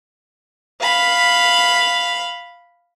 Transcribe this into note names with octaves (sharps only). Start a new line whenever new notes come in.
F5 B5